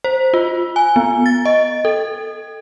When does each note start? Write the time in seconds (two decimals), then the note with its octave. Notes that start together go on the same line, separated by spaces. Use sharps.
0.04 C5
0.34 F4
0.76 G#5
0.96 B3
1.26 A6
1.45 D#5
1.85 A4